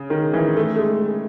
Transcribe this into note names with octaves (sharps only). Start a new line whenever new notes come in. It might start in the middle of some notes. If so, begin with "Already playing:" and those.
Already playing: C#3
D#3
E3
A3
A3
G#3